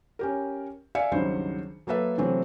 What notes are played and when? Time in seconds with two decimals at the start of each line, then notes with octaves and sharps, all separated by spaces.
0.19 C#4 G4 A#4
0.95 D5 E5 F5 G#5 C#7
1.12 C#2 G2 D#3 F#3 C5
1.87 F#3 A#3 A4 B4 E5
2.18 C3 E3 F#3 A3 C4